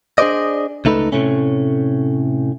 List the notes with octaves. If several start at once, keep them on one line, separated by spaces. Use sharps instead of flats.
D4 G#4 A4 C5 D5 D#5
C#2 A3 D#4 A4 B4
A2 C3 A3 C#4